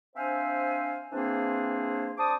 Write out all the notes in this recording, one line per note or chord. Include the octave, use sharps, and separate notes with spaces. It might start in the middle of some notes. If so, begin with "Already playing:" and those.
C4 D4 C5 E5 F5 G#5
E3 A#3 C4 D4 G#4 C5
D4 C5 A5 D6 D#6